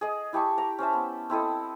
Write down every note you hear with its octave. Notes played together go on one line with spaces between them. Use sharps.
G#4 D#5
E4 G4 A5 C#6
A#5 D6
C#4 C5 E5 A5
B3
C4 E4 A4 D#5